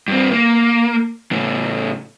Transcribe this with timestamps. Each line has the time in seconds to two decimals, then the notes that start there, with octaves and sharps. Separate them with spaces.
0.08 G2 C4
0.31 A#3
1.31 A2 C#3